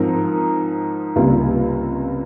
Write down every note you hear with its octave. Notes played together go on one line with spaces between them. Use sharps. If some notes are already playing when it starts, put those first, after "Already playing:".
Already playing: G#2 F3 C4 D#4 A#4
C#2 C3 G3 A#3 F4